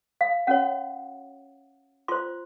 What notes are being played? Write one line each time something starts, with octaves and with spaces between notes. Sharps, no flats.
F5
C#4 F#4 C#5 F#5
F4 C5 C6